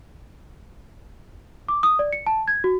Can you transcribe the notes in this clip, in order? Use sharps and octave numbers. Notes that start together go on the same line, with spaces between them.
D6
D#6
D5
C#7
A5
G#6
F#4